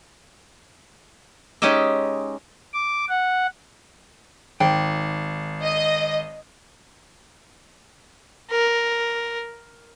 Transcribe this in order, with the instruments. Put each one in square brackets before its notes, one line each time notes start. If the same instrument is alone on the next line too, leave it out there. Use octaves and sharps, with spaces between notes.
[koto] G#3 C#4 D#4 G4 D#5 E5
[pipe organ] D6
F#5
[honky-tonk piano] G#1 [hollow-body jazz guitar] G5
[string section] D#5
[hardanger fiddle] A#4